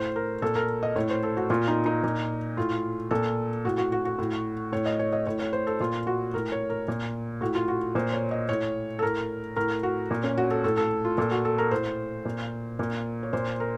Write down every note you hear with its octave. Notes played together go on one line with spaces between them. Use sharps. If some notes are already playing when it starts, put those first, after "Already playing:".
Already playing: A2 C5
A#4
A#2 A4
A#4
D#5
A2 C#5
C5
A4
F#4
A#2 F4
D#4
D#4
A#2
A2 F4
A#2 A4
A2 F#4
F#4
F#4
F#4
A2
A2 C#5
D#5
C#5
D#5
A2 C#5
C#5
C5
A4
A#2 F4
F#4
A2 A#4
C#5
A#4
A#2
A2 F#4
F4
F#4
A#2 C5
C#5
D#5
A2 C#5
A4
A2 A#4
A2 A#4
F#4
A#2
C#4
F#4
A4
A2 A4
A4
F4
A#2 A4
F#4
A4
A#4
A2 C5
A#2
A#2
C#5
A#2 C5
A#4